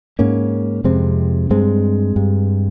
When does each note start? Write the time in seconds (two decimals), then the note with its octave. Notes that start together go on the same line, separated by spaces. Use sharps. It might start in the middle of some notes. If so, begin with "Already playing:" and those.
0.19 G#2 A#3 C#4
0.84 F2 C3 G#3 C4
1.50 G2 G#3 C4
2.16 G2